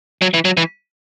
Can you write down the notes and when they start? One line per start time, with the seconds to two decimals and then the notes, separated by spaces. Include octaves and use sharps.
0.22 F#3
0.34 E3
0.45 F#3
0.57 E3